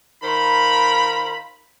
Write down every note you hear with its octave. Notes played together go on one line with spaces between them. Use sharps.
D#3 F4 C5 A#5 B5